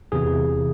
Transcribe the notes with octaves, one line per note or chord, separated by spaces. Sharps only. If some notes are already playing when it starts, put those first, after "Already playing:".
E2 C3 E3 G#4